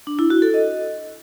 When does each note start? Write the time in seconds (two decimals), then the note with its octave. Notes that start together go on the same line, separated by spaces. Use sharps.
0.07 D4
0.19 E4
0.30 F#4
0.42 A4
0.54 D#5